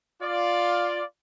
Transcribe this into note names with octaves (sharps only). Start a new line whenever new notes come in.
F4 D5